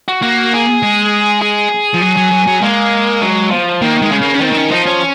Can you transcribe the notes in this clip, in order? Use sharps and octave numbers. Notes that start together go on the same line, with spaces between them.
F#4
A#3 F#4
G#4
G#3
G#4
F3
F#3
F#3
F#3
F#3
G#3 A#3
F#3
F3
D#3 A#3
G#3
C#3
A#3
C#4
D#3 C4
C4
C#4
F3 D#4
C#4